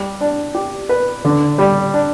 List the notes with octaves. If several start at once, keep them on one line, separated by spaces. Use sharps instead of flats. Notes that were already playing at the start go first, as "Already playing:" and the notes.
Already playing: G3
D4
G4
B4
D3
G3
D4